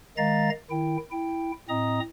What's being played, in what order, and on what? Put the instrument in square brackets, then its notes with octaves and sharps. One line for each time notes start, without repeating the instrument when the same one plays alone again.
[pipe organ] D#3 G#3 D#5 F5 A#5 A6
D#3 E4 G5
E4 G5
A2 C4 D#5 A#5 D#6